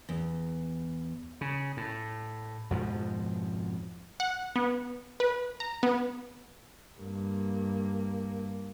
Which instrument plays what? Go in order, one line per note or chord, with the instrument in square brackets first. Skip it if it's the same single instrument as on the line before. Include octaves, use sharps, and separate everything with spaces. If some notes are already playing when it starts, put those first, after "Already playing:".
[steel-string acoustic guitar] E2
[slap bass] C#3
A2
F2 G#2 B2 F3
[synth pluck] F#5
B3
B4
A#5
B3
[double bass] G2 A#3